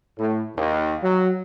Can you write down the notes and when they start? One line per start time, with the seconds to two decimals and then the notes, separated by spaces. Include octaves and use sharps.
0.17 A2
0.56 D#2
1.02 F#3